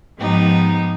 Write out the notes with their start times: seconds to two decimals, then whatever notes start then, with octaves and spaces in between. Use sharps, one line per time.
0.18 G#2 F3 B3 D#4 G4